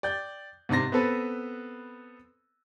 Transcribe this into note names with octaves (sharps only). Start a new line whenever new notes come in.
D5 G5 G6
G#2 C3 D4 C6 A#6
B3 C4 A4 B4